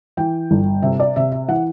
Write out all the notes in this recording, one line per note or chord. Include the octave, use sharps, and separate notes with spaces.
E3 G5
G1
C3 E5
D5
C3 E5
E5
E3 F#5